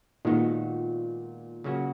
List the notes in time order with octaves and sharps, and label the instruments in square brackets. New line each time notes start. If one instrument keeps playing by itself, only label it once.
[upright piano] A#2 [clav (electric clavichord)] D#3 G#3 B3 D#4 F#4
[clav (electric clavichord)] C#3 F#3 A#3 C#4 F#4